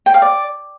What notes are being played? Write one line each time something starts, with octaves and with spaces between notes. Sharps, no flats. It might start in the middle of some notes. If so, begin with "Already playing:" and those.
G5
F5
D5